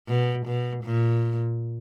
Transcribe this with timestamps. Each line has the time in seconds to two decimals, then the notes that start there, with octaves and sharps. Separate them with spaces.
0.08 B2
0.46 B2
0.84 A#2